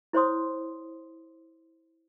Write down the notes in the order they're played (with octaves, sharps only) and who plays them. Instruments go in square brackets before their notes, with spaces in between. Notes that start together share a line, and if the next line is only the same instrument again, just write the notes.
[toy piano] E4 C5 C#5 C6 D#6